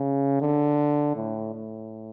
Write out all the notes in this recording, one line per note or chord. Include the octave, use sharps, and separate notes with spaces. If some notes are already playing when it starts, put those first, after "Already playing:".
Already playing: C#3
D3
A2
A2